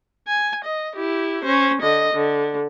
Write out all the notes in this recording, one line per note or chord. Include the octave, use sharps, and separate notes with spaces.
G#5
D#5
E4 G4
C#4 C5
D3 D#5
D3